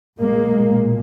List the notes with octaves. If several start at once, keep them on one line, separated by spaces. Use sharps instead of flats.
B1 A#2 G#3 A#3